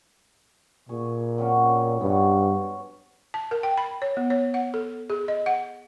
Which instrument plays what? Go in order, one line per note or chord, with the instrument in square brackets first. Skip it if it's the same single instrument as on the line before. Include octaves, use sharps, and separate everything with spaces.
[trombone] A#2 [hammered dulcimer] G#4 C#6
[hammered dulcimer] F#3 C4 C#4
[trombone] G2 [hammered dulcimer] B3 C#5
[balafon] A5
A#4
G5
B5
C#5
B3
C#5
F#5
A4
G#4
D#5
F#5